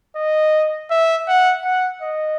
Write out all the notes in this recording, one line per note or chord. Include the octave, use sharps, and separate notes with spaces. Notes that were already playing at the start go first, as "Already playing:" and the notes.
D#5
E5
F#5
F#5
D#5